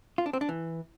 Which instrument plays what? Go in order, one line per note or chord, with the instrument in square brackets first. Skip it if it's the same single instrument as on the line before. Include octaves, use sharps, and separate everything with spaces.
[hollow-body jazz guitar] F4
D4
C4
D4
E3